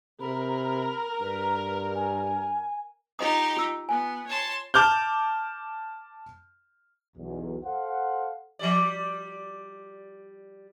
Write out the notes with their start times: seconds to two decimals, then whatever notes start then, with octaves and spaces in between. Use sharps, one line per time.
0.20 C3 A#4 B5
1.21 G2 B4
1.95 G#5
3.19 D#4 F4 G4 D#5 D#6
3.57 F4 E6
3.89 B3 G#5
4.27 C#5 A5 C6
4.74 A5 D6 F6 G6
7.17 B1 E2
7.65 A4 C5 F5 F#5
8.59 F3 G3 D5